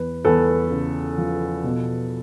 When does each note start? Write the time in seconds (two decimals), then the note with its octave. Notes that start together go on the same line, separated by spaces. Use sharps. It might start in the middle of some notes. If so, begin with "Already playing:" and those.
Already playing: E2 B4
0.25 E2 A4 B4
0.71 C#3
1.18 F3
1.64 B2